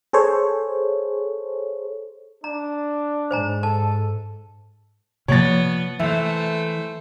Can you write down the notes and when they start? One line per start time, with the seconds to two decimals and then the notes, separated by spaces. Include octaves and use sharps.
0.13 G#4 A4 C5 C#5
2.44 D4 A#5
3.31 G#2 C5 G#5 A#5
3.63 A4 A5
5.28 C3 F3 A#3 B3 C#5 D5 A6
5.99 E3 A3 C5 E5